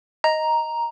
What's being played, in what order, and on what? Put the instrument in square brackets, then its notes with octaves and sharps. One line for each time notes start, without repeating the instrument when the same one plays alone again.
[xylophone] D#5 [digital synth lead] A#5